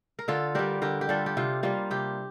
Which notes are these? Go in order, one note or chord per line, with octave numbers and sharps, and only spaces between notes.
A#4
D3 F4 A4
G3 D4 G4 A#4
D3 G4 A#4
G4
G3 D4 F4 A4
G4
C3 F4
G3 A#3 F4
C3 G4